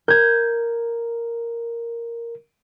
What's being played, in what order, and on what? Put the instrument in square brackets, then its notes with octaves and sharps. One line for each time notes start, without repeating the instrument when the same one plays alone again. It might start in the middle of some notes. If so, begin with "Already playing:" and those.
[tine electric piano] A#4 [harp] G6 G#6